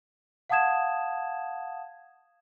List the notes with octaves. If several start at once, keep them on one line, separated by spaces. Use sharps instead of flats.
F5 F#5 A5 D#6 G#6 E7